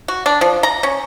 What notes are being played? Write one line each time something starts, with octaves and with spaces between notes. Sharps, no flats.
F#4
D4
F3
A#5
C#4